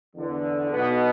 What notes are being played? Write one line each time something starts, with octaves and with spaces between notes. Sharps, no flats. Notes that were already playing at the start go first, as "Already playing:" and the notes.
E2 D3
B1 B2 B3